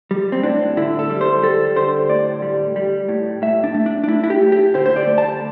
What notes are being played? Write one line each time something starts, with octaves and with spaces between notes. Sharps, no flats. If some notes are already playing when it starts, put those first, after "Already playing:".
G3
C4
A2 D4
D3 E4
A4
G3
C5
G3 A4
D3 C5
A2 D5
G3
G3
A2
A2 E5
D4
A3
D4
D4
A3 E4
E4
G4
A2
G4
D3 C5
C5
D5
A3
A5